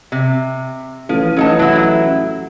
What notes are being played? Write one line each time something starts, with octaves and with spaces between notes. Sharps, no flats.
C3
A1 F3
A1 F#3 D#4 A5
F#3 E4